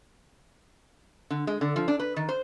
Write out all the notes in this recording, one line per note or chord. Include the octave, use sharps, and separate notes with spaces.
D3
G#3
D3
F3
D4
B4
D#3
C5